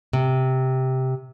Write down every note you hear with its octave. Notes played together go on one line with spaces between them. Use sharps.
C3